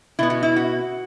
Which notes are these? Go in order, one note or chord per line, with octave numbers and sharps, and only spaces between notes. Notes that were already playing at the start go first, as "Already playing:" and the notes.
B2 B3 E4
F#4
E4
F#4